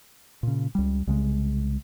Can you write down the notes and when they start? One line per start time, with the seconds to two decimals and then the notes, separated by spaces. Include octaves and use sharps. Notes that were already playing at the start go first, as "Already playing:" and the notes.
0.43 A#2 C#3
0.75 C#2 G3
1.07 C2 C#3 G3 G#3